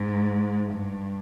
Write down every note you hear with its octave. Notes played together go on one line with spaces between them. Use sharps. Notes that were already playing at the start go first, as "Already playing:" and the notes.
Already playing: G#2
G2